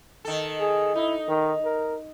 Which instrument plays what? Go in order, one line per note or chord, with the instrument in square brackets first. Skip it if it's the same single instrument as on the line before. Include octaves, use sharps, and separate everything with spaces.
[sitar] D#3 A4
[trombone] G#4
[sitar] D#4 [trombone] E4
[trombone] D#3
A#4